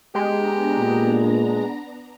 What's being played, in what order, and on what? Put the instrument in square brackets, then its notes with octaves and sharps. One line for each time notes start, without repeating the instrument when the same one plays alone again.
[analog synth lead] G#3 [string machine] B3 D4 A#5 [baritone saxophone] G4
[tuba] A#2